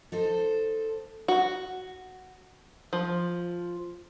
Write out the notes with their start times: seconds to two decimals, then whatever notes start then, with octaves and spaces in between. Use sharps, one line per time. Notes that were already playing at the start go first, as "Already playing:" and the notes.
0.12 D#4 A4 C5
1.28 F#4
2.93 F3